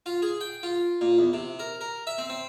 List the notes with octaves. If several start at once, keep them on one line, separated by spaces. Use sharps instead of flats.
F4
G#4
G5
F4
A#2
E2
C3
A#4
A#4
E5
C4
C4